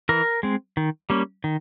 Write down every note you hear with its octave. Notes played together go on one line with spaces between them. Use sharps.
E3 A#4
G#3 C4
D#3
G3 A#3 C#4
D#3